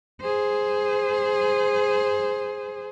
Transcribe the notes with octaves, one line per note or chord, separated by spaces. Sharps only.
G#4 C5